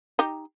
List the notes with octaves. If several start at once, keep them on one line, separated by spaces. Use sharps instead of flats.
D#4 G4